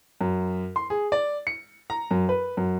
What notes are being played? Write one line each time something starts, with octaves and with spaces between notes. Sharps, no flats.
F#2
C6
G#4
D5
C#7
A#5
F#2
B4
F#2